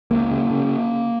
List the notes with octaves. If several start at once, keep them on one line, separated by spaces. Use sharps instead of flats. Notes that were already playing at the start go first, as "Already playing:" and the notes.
C#2 A#3
C#3
C#3